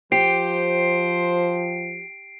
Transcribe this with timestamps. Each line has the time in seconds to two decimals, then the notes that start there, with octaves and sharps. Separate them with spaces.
0.12 F3 G4 C5 C7 D7